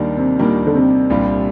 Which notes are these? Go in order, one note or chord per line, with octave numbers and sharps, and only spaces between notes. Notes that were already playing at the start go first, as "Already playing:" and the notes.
Already playing: D#2 D#3 G3 A#3 D4
C3
D#2 A#2 D#3 G3 A#3 D4
D3
C3
C2 A#2 G3 D4 F4